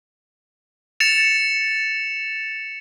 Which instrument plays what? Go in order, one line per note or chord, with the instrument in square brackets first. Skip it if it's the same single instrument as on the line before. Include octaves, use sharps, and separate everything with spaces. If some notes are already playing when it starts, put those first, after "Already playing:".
[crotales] A6 C#7 E7 F7